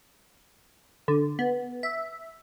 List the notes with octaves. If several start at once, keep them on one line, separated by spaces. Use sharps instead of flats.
D3
B3
E5